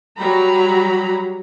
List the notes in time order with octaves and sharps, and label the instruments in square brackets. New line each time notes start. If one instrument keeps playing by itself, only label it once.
[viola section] F#3 G3 A#5 B5